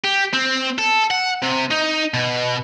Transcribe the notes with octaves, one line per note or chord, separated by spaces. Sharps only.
G4
C4
A4
F#5
C3
D#4
B2